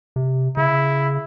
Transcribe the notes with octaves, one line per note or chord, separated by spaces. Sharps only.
C3
C#3 E4